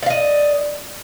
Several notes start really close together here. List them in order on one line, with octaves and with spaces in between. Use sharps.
D5 F5 D#5